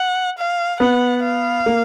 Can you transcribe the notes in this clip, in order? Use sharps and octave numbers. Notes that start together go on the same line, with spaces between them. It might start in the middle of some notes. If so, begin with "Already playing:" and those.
Already playing: F#5
F5
B3 F#5
F5
A#3